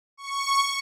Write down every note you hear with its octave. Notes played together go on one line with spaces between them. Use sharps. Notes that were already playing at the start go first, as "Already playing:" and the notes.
C#6